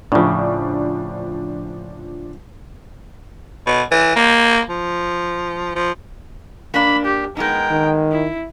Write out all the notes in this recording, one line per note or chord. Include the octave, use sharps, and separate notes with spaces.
A2 C#3 F3 D4
B2
E3
A#3
F3
F3
A#3 D4 B5
G4
G#3 B3 D#4 A#4 G5
D#3
E4